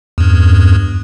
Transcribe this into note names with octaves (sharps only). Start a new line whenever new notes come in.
E2 G2